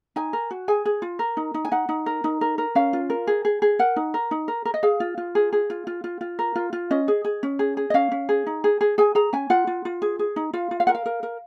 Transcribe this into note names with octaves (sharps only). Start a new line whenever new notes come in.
D#4 G#5
A#4
F#4
G#4 G#5
G#4
F4
A#4
D#4
D#4
G#5
D#4 F#5
D#4
A#4
D#4
A#4
A#4
C#4 F5
F4
A#4
G#4
G#4
G#4
A#4 F#5
D#4
A#4
D#4
A#4
A#4
D#5
G#4 F5
F4
F4
G#4
G#4
F4
F4
F4
F4
A#4
F4
F4
C#4 D#5
G#4
G#4
C#4
G#4
G#4
D#5
C#4 F5
C#4
G#4
D#4
G#4
G#4
G#4 G#5
G#4 A#5
C#4 G#5
F4 F#5
F4
F4
G#4
G#4
D#4
F4 F5
F4
F5
A#4 F#5
F5
A#4
A#4